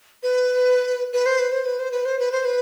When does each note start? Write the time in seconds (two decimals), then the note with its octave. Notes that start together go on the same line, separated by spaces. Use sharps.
0.23 B4
1.13 B4
1.26 C5
1.39 B4
1.52 C5
1.65 B4
1.79 C5
1.92 B4
2.05 C5
2.19 B4
2.32 C5
2.45 B4